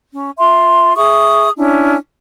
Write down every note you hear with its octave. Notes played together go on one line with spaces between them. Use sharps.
C#4
F4 E5 C6
G#4 E5 C#6 D#6
C#4 D4 E4